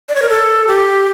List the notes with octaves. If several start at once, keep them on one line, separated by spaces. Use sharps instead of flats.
D5
C#5
A#4
A4
G4